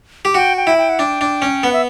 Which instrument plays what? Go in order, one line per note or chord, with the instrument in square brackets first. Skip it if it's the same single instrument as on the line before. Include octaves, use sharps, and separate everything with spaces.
[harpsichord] G4
[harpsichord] F#4 [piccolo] G5
[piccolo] G5
[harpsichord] E4
[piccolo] G5
F#5
[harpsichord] D4 [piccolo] G5
[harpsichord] D4
C#4
[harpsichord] B3 [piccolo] F#5
[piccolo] E5